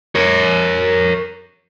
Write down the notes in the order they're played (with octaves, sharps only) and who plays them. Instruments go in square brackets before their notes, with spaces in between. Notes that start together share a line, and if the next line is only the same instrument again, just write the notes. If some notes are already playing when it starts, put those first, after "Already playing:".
[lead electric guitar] A#4 C#5